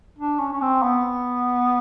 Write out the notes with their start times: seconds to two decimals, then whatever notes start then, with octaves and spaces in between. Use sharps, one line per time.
0.19 D4
0.39 C#4
0.53 C#4
0.62 C4
0.83 B3